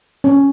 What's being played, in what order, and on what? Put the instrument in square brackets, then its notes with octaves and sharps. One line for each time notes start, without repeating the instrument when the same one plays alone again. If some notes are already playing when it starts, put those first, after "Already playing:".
[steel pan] C#4